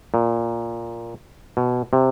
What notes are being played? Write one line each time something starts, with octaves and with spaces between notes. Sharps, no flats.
A#2
B2
C3